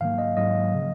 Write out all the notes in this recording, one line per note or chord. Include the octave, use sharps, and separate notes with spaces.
G#2 D#3 F#3 A#3 F5
D#5
G#2 D#3 F#3 A#3 D#5
C#3 F3